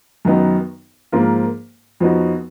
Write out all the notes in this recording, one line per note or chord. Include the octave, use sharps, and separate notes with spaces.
F#2 D#3 F#3 B3 D#4
G#2 F3 A#3 F4
F2 F3 B3 D#4 F#4